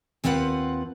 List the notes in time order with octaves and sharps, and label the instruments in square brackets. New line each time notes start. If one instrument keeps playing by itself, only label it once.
[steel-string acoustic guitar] D#2 C4 F4 B4 F#5